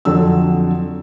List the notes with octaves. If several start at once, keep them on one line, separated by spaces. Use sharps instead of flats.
F2 D3 F#3 E6